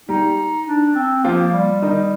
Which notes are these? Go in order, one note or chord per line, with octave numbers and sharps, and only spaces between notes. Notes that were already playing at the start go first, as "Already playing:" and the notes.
G3 D#4 G4
D4
C4
F3 A#3 F4
G3
D#3 D#4